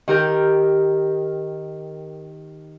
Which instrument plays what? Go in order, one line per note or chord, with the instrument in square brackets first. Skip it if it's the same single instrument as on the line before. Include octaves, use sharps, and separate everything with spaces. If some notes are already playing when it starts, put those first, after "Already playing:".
[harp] D#3 G4 A#4 G6